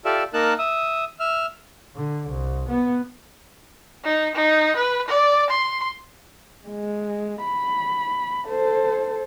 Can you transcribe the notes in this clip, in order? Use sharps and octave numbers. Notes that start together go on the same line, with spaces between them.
F4 G4 A4 D5 E5
A#3 D#4 A#4 A5 F#6
E5 D#6
E5 F6
D3
C2
B3
D#4
D#4
B4
D5
C6
G#3
B5
A4 C5